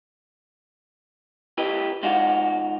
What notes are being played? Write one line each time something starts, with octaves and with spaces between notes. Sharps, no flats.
E4 G4 B4 D#5
G#2 D#4 F4 F#4